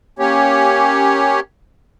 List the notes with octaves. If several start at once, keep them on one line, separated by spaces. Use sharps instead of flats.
A#3 C#4 G4 C#5